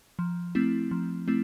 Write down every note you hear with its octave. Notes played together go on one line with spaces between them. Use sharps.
F3
A3 C4 E4
F3
A3 C4 E4